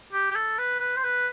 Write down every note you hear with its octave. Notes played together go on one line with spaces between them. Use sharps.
G4
G4
A4
B4
B4
C5
B4